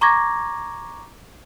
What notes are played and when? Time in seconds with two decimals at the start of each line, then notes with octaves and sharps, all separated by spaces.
0.01 A#5 C#6 D6 G#6 A#6